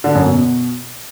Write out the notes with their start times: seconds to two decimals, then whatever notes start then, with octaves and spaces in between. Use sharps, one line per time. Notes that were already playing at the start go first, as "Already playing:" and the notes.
0.04 D3
0.15 F#2
0.26 B2